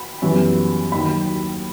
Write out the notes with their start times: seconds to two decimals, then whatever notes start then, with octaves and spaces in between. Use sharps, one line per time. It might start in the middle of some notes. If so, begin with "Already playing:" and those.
Already playing: B5
0.22 F#2 E3 G3 B3
0.92 D#2 D#3 F#3 B5